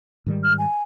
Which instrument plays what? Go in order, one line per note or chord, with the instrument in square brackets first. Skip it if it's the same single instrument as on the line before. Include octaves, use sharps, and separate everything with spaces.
[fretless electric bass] G#2 D#3 G3
[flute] F6
G#5